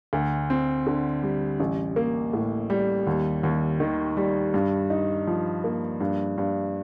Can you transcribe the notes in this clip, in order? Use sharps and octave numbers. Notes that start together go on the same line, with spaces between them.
D2
C4
D3
G3
A1
A#3
A2
G3
D#2
D#2
D#3
G3
G2
D#4
F3
A#3
G2
G2